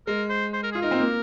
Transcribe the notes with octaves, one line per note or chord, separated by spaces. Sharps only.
G#3 A#4
C5
C5
A#4
F4 G#4
D#4 A#4
C4
A#3